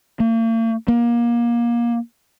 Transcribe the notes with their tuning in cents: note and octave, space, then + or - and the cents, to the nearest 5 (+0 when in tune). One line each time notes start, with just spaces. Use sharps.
A#3 -45
A#3 +25